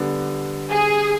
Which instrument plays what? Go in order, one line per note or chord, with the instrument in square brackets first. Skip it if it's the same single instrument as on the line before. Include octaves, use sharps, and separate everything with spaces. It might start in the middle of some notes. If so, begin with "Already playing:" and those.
Already playing: [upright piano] D3 G3 B3
[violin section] G#4